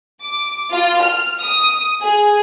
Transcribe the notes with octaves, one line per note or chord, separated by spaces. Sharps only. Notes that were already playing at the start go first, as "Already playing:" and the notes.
D6
F4
F6
D#6
G#4